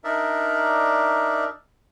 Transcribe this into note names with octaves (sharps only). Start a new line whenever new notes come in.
D4 D#4 A#4 D5 E5